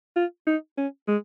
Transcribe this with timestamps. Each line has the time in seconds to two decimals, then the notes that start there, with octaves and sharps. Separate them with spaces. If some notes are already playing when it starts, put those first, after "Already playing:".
0.16 F4
0.47 D#4
0.78 C#4
1.08 G#3